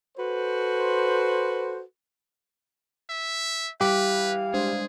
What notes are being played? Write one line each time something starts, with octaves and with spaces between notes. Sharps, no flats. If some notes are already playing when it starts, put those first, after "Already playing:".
F#4 A4 B4 C5
E5
E3 G3 G4 B4 F5
G#3 D4 G#4 C5